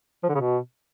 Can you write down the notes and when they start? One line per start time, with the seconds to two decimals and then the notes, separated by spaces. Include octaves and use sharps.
0.23 F3
0.29 D3
0.35 C#3
0.40 B2